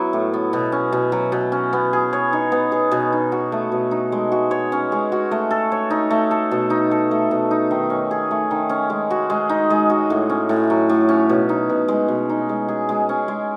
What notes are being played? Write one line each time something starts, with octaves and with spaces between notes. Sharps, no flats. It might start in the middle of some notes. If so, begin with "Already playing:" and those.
Already playing: F#3 B3 E4
A2
B3
B2
C#4
B2
F#3
B2
C#4
B3
G#4
C#5
D#4
B3
G#4
B2
D#4
F#4
A3
B2
D#4
G#3
F#4
C#5
C#4
G#3
F#4
A3
A4
C#5
D#4
A3
A4
B2
D#4
A4
A3
B2
D#4
D#3
C#4
G#4
A3
D#3
C#4
G#3
F#4
G#3
D#4
G#3
F#4
A2
C#4
A2
F#3
A2
C#4
B2
D#4
B2
G#3
B2
D#4
G#3
G#4
G#3
C#4
G#3